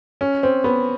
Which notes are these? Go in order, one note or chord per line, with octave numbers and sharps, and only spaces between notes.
C#4
C4
B3